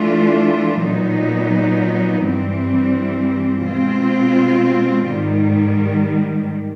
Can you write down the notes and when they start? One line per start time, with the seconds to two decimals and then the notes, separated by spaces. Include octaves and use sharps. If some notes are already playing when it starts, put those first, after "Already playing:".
Already playing: E3 A3 D4 F4
0.83 A#2 F#3 B3 D#4
2.26 G2 E3 G3 C4
3.68 B2 G#3 C4 F4
5.10 G#2 D#3 G3